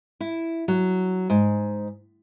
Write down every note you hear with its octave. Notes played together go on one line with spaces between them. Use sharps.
E4
F#3
G#2